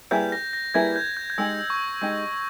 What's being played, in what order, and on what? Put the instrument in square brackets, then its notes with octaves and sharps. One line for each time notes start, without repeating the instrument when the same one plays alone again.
[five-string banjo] G3 A#3 E4 G#4 B4 [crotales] G6
[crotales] A#6
A#6
[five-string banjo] G3 A#3 E4 G#4 B4 [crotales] G#6
[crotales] G6
G6
G6
[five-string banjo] G#3 D#4 G4 [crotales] E6
[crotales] C#6
[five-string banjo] G#3 D#4 G4